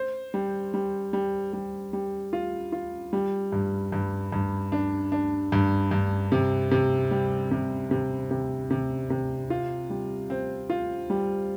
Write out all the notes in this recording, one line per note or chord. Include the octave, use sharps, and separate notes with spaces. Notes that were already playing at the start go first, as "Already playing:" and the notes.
Already playing: C5
G3
G3
G3
G3
G3
F4
F4
G3
G2
G2
G2
D4
D4
G2
G2
C3
C3
G3
C3
C3
C3
C3
C3
F4
G3
C4
F4
G3